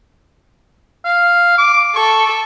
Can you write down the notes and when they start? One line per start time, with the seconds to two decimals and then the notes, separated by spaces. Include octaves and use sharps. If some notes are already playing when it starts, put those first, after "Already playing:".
1.05 F5
1.58 D6
1.96 A4 C#6